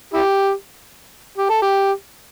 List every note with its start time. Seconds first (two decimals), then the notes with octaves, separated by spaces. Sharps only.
0.14 E4 G4
1.37 G4
1.49 A4
1.62 G4